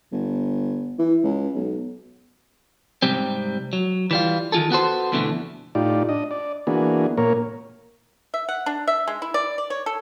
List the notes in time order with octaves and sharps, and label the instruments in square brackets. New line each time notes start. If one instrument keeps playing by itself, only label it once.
[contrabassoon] G1
E3
C#2
B1
[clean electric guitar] G#2 C3 G3 C4
F#3
E3 G3 F4
D#3 E3 F4 G#4 A4
B3 F#4 A4 C5
F2 B2 D3 E3 A3
[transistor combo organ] A2 D#4 F4 G4 D5
D4 D#5
D5
E3 A#3 B3 D4 F#4 G#4
A#2 A#3 A#4 C#5
[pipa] E5
F#5
D4
E5
G#3
E4
D5
D5
C#5
A4